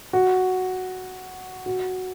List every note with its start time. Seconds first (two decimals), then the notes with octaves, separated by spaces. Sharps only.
0.13 F#4
1.66 F#4